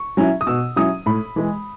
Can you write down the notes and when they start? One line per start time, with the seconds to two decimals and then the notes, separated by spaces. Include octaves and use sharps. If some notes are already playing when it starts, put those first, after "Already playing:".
Already playing: C#6
0.17 F#3 C#4 E4
0.41 D#6
0.47 B2 E6
0.76 F#3 C#4 E4 D#6
1.06 A2 B5
1.36 E3 G#3